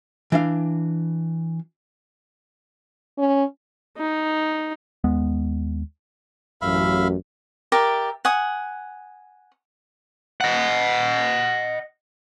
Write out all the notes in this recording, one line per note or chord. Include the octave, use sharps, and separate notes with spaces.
E3 D4 F5
C#4
D#4
D#2 G#3 B3
A1 F#2 E5 F5 B5
G4 A#4 D5 E5
F#5 G#5 D#6
D#5 F#5